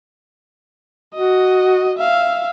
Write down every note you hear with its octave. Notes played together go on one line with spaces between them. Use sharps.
F#4 D#5
E5 F5